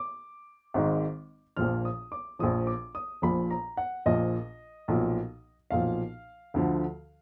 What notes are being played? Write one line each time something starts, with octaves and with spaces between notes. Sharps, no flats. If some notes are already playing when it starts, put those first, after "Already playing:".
Already playing: D6
G#1 G#2 D#3
A#1 A#2 F3 F6
D#6
D6
A#1 A#2 F3 D#6
D6
D#6
A#1 A#2 F3 B5
A#5
F#5
A#1 A#2 F3 D#5
B1 A#2 F3
B1 A#2 F3 F5
D2 D3 F3